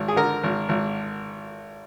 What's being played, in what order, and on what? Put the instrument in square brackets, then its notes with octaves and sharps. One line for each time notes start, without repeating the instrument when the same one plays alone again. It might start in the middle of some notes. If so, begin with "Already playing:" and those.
Already playing: [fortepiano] G#1
G#4
D3 A#4
G#1
G#1